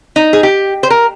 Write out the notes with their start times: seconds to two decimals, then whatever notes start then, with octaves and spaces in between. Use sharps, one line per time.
0.16 D#4
0.33 G#4
0.43 G4
0.83 C5
0.90 A#4